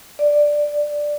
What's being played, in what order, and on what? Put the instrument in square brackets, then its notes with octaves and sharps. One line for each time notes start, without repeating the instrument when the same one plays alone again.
[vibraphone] D5